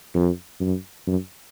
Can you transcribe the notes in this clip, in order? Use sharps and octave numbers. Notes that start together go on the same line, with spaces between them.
F2
F#2
F#2